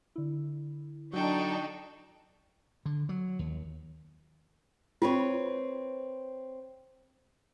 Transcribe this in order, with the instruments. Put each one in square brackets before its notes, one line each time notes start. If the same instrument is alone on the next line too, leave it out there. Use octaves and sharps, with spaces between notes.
[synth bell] D3 E4
[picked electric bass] F#3 [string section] D4 D#4 A4 [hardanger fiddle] G5 C#6
[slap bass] D3
F#3
D#2
[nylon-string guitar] C4 B4 C#5 [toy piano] F4